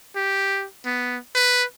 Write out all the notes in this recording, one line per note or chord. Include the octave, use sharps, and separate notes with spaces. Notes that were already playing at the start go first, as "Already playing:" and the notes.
G4
B3
B4